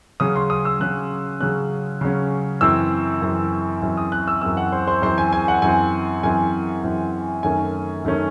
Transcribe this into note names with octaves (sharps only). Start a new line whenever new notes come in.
C#3 F#3 C#4 D#6
C6
D#6
E6
C#3 F#3 C#4 F#6
C#3 F#3 C#4 F#6
C#3 F#3 C#4
F#2 E3 C4 E6
F#2 E3 C4
F#2 E3 C4
D#6
F#6
E6
F#2 E3 C4 E6
F#5
C5
C5
F#2 E3 C4 C5
G#5
G#5
F#5
F#2 E3 C4 G#5
F#2 E3 C4 G#5
F#2 E3 C4
F#2 D#3 A3 C#4 G#5
F#2 D#3 A3 C#4